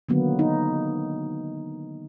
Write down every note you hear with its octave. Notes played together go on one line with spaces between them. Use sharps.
D3 D#3 F#3 A#3 B3
D#4